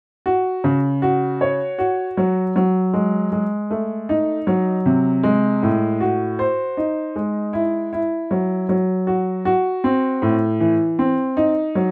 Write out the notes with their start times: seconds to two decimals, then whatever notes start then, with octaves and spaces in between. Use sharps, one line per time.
0.26 F#4
0.64 C#3
1.02 F#4
1.41 C#5
1.78 F#4
2.17 F#3
2.56 F#3
2.94 G#3
3.32 G#3
3.71 A3
4.09 D#4
4.47 F#3
4.86 C3
5.23 G#3
5.63 A2
6.00 F#4
6.39 C5
6.77 D#4
7.16 G#3
7.53 E4
7.93 E4
8.31 F#3
8.69 F#3
9.07 F#4
9.45 F#4
9.84 C4
10.22 A2
10.60 E3
10.99 C4
11.37 D#4
11.75 F#3